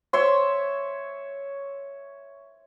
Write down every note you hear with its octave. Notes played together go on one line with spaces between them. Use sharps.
C#5 E5 C6 C#6